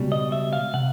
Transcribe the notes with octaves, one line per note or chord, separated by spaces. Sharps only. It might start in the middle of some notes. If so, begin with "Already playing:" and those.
Already playing: C#2 B2 G3
D#5
E5
F5
C3 F#5